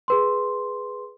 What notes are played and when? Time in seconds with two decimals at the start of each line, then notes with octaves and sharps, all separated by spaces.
0.08 G#4 B4 C6